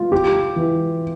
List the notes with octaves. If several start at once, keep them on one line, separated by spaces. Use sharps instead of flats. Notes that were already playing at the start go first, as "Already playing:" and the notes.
Already playing: F4
G4
E3